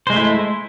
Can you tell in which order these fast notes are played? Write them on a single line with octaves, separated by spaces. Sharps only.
C5 G#3 A3 E4